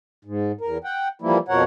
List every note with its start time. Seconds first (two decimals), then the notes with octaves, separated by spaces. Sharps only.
0.25 G#2
0.61 E2 A#4
0.84 F#5 G5
1.22 E3 F3 G3 A#3 E4
1.48 F2 B2 F3 A#4 C#5 F#5